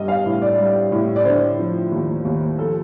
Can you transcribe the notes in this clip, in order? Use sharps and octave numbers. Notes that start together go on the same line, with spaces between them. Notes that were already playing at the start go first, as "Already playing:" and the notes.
Already playing: G2 G3 D#5
F5
A2
D5
G3
A2
D5
D3 C5
F3
D#2
D#2
F3 A4